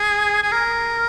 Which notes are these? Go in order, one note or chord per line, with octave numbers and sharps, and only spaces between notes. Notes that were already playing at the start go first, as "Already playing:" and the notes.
Already playing: G#4
G#4
A#4